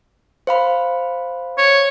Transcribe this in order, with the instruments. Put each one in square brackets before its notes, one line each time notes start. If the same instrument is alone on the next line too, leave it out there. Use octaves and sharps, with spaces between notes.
[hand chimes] C5 F5 B5
[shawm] C#5